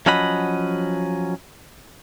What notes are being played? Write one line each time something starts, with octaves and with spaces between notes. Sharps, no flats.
F3 F#3 C#4 D#5 F#5 B5